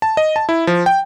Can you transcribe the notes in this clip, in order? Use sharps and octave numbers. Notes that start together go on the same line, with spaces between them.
A5
D#5
A5
E4
F3
G5